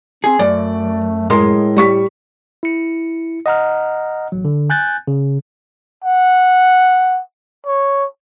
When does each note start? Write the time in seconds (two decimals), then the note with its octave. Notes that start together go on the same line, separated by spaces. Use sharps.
0.24 C4 G#4
0.39 F#2 A3 D5
1.30 A2 G#3 A#4 C6
1.76 G3 C#6 B6
2.63 E4 C#7
3.46 D#5 F#5 A#5 F6
4.32 A1 F#3
4.45 D3
4.70 G#5 F#6 G6 A6
5.07 C#3
6.04 F#5
7.66 C#5